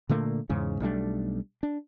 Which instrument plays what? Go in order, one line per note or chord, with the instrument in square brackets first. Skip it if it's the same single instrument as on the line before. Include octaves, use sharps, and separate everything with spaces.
[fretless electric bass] A#2 D3 A3 A#3
E2 G#2 C#3 C#4
B1 G3 A3 D4
D4